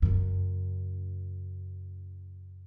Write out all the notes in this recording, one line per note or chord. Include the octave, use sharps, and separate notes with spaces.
F#2 C#3